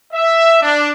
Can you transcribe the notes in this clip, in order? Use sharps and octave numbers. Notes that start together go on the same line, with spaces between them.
E5
D4